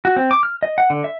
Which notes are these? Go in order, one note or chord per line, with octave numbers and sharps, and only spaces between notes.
F#4
C4
D6
F6
D#5
F#5
D3
E5